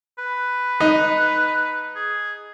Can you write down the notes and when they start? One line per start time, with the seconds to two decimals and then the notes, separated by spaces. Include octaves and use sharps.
0.18 B4
0.80 D#4
1.95 G#4